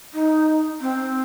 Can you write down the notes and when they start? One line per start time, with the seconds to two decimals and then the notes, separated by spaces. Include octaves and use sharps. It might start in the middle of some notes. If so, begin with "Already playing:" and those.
0.14 D#4
0.81 C4